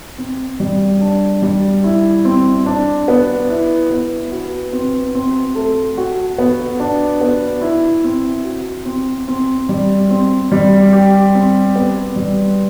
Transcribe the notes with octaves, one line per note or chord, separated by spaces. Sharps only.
C4
G3
D4
G3
E4
C4
D4
B3
E4
B3
F#4
C4
C4
A3
F#4
B3
D4
B3
E4
C4
F#4
C4
C4
G3
C4
G3
G4
C4
B3
G3